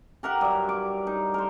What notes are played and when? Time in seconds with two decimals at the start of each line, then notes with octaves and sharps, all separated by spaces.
0.23 G4 A#4 E5 F#5
0.41 G2 F#3
0.69 D6
1.07 D#4
1.34 A#4 C5